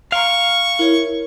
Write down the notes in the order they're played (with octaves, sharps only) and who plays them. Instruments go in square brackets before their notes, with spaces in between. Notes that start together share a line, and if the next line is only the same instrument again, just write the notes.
[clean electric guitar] F5 [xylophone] A#5 C6 D7 [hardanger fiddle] C#6
[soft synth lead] E4 [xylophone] A#4 C#5